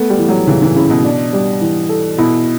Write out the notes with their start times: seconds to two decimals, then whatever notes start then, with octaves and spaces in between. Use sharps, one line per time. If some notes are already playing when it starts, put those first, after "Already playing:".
Already playing: A3 B3
0.10 G3
0.19 E3
0.29 F#3
0.47 C#3 E3
0.62 E3
0.76 C#3 E4
0.90 B2
1.04 D4
1.33 G3
1.61 E3
1.89 A4
2.18 B2 E4